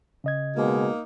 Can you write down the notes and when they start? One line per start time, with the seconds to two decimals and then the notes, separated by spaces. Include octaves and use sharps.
0.24 C#3 D#5 G#6
0.56 B2 G#3 A#3 D#4